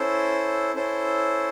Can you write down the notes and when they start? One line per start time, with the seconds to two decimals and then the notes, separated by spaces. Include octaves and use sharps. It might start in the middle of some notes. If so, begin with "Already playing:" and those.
Already playing: C#4 E4 A4 C5
0.75 C#4 E4 A4 C5